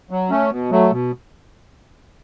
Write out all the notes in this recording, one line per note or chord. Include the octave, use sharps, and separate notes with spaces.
F#3
A3 C#4
B2
F#3 A3
B2